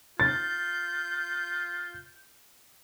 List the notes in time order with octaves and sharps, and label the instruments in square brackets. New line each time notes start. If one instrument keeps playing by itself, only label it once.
[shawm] F4 [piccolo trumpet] G6 [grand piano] A6